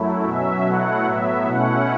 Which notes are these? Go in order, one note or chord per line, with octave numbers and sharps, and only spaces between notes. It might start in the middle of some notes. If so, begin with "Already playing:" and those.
Already playing: F#2 F#3 A3 E4
B2 F#3 C#4 E5
B2 F#3 A3 E4 F#5
A2 F#3 B3 E5
B2 A3 C#4 E4 F#5